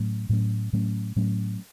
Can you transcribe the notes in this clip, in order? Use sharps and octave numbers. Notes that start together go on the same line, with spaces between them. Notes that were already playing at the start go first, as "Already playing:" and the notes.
Already playing: A2 F#3 A3 C#4
A2 F#3 A3 C#4
A2 F#3 A3 C#4
A2 F#3 A3 C#4